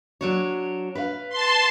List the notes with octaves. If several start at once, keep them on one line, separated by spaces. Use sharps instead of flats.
F#3 D4 C#5
B4 F5
A5 C6